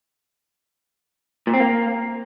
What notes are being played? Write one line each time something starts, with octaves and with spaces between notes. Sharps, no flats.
A#2
C4
A#3